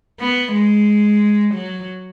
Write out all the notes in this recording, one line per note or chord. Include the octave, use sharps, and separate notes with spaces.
B3
G#3
F#3